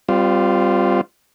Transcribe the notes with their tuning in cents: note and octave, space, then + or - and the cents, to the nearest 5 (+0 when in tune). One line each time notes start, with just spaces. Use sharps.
G3 +0 C4 -35 F4 +0